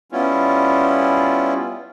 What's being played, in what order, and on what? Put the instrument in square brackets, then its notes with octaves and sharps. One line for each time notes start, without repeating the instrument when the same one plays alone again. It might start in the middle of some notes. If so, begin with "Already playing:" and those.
[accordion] G3 B3 C#4 E4 F4